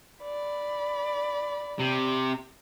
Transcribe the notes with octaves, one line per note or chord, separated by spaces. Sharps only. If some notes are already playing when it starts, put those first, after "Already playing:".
D5 B5
C3